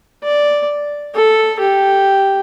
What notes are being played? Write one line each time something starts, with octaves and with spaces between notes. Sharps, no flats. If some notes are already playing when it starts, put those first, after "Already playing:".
D5
A4
G4